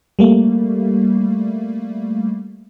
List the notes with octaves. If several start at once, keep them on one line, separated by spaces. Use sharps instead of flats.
G3 A3 A#3